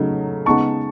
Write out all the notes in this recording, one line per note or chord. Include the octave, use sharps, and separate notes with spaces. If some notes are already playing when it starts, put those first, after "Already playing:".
Already playing: C#3 F#3 A3 D#4
C#3 G#3 B3 D#4 A5 C#6